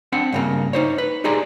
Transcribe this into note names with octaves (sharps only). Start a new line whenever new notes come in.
C4 D4 F#5
G2 C#3 A#3
D#4 C5 C#5
B4
D#4 G4 G#4 D5 A#5 C6